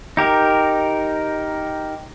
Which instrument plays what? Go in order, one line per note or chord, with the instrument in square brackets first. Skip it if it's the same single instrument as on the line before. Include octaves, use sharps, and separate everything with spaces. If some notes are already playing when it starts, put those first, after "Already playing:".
[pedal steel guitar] D#4 G4 A#4